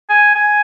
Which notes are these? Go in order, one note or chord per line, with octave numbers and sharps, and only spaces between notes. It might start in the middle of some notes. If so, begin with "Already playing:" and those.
G#5
G#5